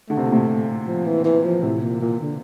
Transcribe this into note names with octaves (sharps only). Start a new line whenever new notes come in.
D3 A3
C3
A#2
A2 C3
F3
E3
E3
F3
A2 C3 E3
A#2
A#2
D3